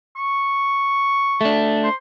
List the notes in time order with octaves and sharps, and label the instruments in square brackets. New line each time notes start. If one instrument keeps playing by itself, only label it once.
[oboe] C#6
[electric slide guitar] A3 D4
[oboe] C5